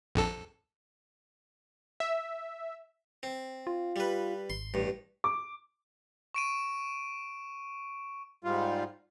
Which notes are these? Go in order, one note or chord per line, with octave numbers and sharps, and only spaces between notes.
A#1 F2 A4
E5
C4
F4
G3 B4
G#1 C6
A1 G2
D6
C#6 D7 D#7
G#2 G3 F4